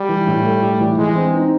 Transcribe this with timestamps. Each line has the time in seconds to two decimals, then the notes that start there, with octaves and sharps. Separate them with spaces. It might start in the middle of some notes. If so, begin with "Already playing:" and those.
Already playing: G3
0.09 E3
0.27 A2
0.45 A3
0.62 A2
0.80 E3
0.97 E3 G#3
1.16 C4
1.34 D#4